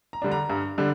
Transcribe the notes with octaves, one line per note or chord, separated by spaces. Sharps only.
A#5
D3 G3 D4
A#5
G2
D3 G3 D4